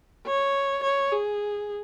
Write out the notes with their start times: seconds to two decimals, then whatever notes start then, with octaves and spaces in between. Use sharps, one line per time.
0.26 C#5
0.83 C#5
1.12 G#4